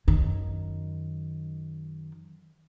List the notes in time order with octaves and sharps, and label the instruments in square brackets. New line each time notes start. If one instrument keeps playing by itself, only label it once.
[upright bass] F#2 D#3